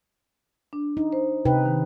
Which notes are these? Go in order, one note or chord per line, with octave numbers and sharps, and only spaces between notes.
D4
D#4
C5
C3 D#4 B4 G5
D#3